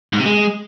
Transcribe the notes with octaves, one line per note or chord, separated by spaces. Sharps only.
G#2
C3
G#3